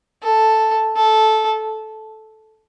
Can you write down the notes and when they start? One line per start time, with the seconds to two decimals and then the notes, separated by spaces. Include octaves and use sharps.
0.23 A4
0.96 A4